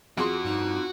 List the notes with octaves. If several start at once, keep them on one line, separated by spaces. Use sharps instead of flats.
F2 F#4 G#4 C6
G2 D#4